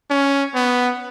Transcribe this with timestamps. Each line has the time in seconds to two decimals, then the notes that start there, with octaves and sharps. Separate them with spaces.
0.10 C#4
0.55 B3